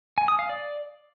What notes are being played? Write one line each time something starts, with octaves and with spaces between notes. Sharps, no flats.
G#5
D#6
F5
D5